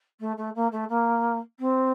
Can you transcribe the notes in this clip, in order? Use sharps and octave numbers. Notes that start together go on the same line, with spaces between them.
A3
A3
A#3
A3
A#3
C4